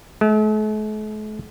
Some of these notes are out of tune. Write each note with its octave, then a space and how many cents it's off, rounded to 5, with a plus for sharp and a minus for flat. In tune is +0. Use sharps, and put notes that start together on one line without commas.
A3 -45